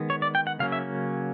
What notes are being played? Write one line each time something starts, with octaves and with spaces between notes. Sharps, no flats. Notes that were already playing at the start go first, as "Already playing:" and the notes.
Already playing: D#3 G#3 B3
C#5
D5
G5
F#5
C#3 F#3 A#3 C#4 F5
E5